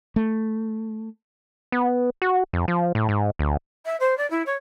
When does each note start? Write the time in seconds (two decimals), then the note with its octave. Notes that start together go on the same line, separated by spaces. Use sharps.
0.16 A3
1.72 B3
2.22 F#4
2.53 F2
2.68 F3
2.95 A2
3.09 G#2
3.39 D2
3.85 E5
4.00 C5
4.17 D5
4.30 E4
4.45 C#5